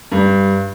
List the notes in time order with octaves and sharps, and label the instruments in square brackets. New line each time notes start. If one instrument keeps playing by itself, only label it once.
[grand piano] G2